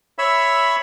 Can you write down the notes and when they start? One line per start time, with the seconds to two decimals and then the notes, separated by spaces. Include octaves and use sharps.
0.18 C#5 E5 B5 E6